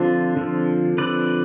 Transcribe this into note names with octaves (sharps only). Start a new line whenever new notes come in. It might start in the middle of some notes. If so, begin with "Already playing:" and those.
Already playing: D3 F3 C4 D4 F4
D3 F3 C4
D3 F3 C4 B4 D5